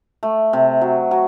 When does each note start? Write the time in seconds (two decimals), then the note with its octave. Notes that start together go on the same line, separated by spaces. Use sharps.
0.23 A3
0.53 C3
0.81 F#3
1.11 F#3